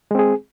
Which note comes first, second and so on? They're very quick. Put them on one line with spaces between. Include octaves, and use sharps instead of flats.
G#3 C4 G#4